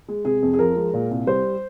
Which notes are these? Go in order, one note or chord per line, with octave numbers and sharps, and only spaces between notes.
G#3
C3 G#4
F2
G#4
F3 A#4
G#3
A#2
C2
G3 C5